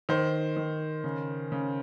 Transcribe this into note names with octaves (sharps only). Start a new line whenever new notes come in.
D#3 C5
D#3
C#3
C#3